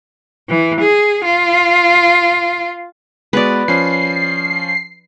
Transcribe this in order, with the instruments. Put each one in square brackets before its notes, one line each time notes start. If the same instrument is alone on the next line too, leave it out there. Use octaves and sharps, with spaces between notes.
[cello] E3
G#4
F4
[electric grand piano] G#3 B3 F#4 [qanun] B4 D5
[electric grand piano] F3 C#4 [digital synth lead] C7